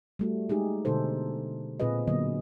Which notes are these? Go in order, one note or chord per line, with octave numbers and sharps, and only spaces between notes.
G3 A3 F#4
G#3 D#4 G4 G#4
B2 D3 D#4 A4 C5
A#2 C4 F4 G#4 B4 D#5
D3 F#3 A#3 B3 D#5